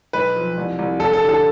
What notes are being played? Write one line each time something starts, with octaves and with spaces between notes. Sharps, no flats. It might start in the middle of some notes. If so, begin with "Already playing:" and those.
B1 B4
F3
C2
C2
F1 A4
A4
D3
A4